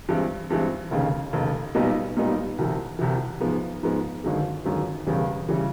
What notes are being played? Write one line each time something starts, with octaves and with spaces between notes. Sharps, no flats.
G2 E3 G#3 C4
G2 E3 G#3 C4
F1 D#2 C#3
F1 D#2 C#3
B1 A#2 G3 B3 D#4
B1 A#2 G3 B3 D#4
C2 C3 E3
C2 C3 E3
G#2 F3 G#3 B3
G#2 F3 G#3 B3
G1 F#2 D#3 G#3
G1 F#2 D#3 G#3
E1 E2 C#3 E3 G3
C#3 E3 G3